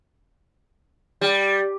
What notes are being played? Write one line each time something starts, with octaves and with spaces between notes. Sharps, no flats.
G3